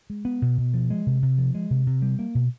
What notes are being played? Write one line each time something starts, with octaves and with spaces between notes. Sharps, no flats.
G#3
B3
B2
B2
F3
G#3
C3
C3
F3
G#3
C3
C3
G3
A#3
B2